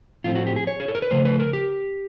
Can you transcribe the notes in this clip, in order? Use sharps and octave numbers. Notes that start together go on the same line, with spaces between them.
A2 F3 A3 C4 F4
F#4
G4
G#4
C#5
G#4
A4
A#4
B4
C#3 F3 A3 C5
B4
A#4
G4